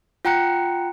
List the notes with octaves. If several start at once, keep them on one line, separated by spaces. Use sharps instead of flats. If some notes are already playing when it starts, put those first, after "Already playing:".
F4 F#5 G5 A#5 F#6 C#7